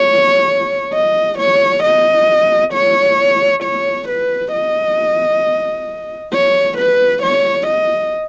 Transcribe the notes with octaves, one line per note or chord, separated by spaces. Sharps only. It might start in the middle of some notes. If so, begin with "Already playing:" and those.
Already playing: C#5
D#5
C#5
D#5
C#5
C#5
B4
D#5
C#5
B4
C#5
D#5